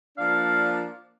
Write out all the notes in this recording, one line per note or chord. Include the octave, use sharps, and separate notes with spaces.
F3 A#3 D4 F5